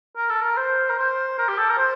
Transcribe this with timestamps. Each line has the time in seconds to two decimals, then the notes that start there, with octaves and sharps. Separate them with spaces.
0.17 A#4
0.29 A4
0.41 A#4
0.57 C5
0.90 A#4
0.99 C5
1.38 A#4
1.48 G4
1.58 A4
1.69 A#4
1.78 C5